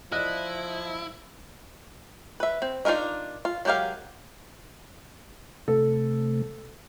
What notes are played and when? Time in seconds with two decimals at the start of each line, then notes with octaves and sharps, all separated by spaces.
0.12 F3 E4 D5 D#5 F#6
2.40 B4 E5
2.62 C4
2.85 D4 D#4 F4 A#4 D#5
3.45 F4
3.65 F#3 G#3 G4 A#4 F5
5.68 C3 A3 A4